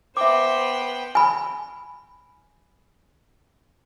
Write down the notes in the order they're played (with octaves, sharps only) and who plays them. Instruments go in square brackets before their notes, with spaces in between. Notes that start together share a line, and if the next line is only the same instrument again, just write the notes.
[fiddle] B3 G5 [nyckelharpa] C5 [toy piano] E5 D6
[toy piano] G#5 B5